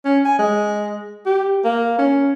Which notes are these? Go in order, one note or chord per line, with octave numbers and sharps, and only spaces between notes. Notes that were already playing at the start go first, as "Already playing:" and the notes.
C#4
G#5
G#3
G4
A#3
C#4